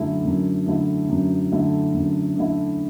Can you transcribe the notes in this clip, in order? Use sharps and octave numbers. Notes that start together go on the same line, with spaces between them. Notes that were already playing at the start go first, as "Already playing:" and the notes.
Already playing: F#2 D3 A3 E4
F#2
D3 A3 E4
F#2
D3 A3 E4
F#2
D3 A3 E4